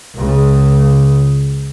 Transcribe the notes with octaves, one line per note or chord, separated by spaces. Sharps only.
C#2 C#3